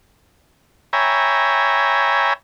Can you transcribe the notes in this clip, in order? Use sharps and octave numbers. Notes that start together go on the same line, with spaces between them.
C#5 E5 G5 G#5 A#5 B5